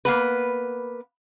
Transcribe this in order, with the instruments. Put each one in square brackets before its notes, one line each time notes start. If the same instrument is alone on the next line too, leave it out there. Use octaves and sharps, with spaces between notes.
[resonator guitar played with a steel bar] A#3 B3 B4